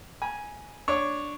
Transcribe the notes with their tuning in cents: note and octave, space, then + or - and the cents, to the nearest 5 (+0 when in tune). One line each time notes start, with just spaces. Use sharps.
G#5 +0 B5 -45
D4 +0 C#5 +0